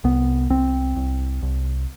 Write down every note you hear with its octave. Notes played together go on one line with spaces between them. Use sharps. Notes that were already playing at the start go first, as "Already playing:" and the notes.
C2 B3
C2 C4
C2
C2